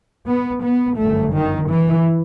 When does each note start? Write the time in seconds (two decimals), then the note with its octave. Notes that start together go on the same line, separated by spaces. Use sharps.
0.27 B3
0.63 B3
0.98 G1 F#2 A3
1.34 D#3
1.70 E3